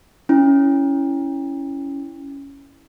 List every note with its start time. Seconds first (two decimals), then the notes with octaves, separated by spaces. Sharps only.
0.29 C#4 E4